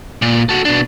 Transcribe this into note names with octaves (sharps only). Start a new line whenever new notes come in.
A#2
F#4 A4
B2 D4